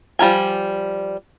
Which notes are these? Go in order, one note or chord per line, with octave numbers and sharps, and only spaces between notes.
F3 G3 F4 A#4 G#5